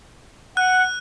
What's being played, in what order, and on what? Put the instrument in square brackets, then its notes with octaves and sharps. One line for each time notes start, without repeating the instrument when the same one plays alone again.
[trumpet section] F#5 [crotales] F#6